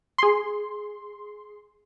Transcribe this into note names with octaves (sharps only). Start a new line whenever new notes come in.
G#4 C6